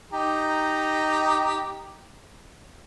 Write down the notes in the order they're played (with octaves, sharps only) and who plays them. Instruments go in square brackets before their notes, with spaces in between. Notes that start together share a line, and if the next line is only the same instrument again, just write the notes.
[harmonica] D#4 G4 A#5